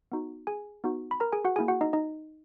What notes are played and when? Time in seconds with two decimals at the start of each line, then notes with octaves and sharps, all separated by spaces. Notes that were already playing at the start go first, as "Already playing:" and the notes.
0.12 B3 D#4 F#4
0.47 G#4 G#5
0.84 B3 D#4 F#4
1.11 B5
1.20 A#4 A#5
1.32 G#4 G#5
1.45 F#4 F#5
1.56 A#3 E4 G#4 G#5
1.68 F#4 F#5
1.81 D#4 D#5
1.93 D#4 D#5